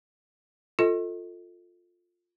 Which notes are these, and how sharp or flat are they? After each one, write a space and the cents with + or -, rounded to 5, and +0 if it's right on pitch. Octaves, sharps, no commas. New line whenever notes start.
F4 +10 A4 +15 D#5 +30